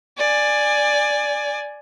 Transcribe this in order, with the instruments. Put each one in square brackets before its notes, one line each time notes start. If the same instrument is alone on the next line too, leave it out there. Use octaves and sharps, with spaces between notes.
[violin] D5 G#5